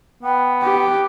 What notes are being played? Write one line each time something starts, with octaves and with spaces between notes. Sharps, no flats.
B3 G5
G4